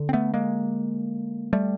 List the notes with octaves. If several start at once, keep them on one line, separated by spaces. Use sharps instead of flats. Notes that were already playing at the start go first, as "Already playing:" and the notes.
Already playing: D3
C4
A3 B3
G#3 A#3
G3 A3